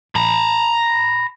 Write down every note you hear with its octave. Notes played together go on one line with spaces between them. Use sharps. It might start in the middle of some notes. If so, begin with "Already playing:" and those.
A#5 B5